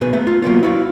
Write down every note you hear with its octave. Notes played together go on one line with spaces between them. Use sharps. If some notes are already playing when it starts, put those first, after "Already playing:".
B1 B2 G#4 B4
A3 B3 E5
F4
F#3 A#3 B3 F4
E4 F#4 F5